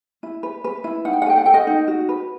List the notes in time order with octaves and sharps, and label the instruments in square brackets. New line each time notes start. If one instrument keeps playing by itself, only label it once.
[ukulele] E4
B4
B4
E4
D#4 F#5
G5
F#5
A4 G5
F#5
A4 G5
D#5 F#5
D#4
F#4
B4